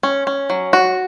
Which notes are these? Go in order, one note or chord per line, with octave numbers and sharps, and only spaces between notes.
C#4
C#4
F#3
F#4